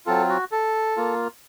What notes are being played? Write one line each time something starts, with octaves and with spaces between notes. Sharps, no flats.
F#3 C4 F4 A4
F#4
A4
A#3 F4